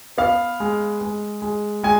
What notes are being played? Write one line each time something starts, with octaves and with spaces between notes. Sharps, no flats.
B3 F5
G#3
G#3
G#3
G#3 G#5